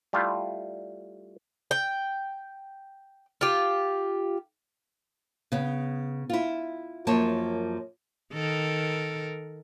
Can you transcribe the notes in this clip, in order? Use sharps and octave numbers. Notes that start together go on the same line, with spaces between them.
G3 A3 E4 F4
G5
F4 G4
C#3 B3
E4 F4
F#2 F3 A#3 C#5 A5
D#3 A4 A#4